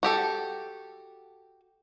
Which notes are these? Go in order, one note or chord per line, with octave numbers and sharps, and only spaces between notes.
F#4 G4 A4